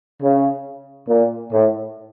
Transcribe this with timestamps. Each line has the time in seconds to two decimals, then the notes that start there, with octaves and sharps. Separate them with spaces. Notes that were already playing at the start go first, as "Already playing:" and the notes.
0.21 C#3
1.08 A#2
1.51 A2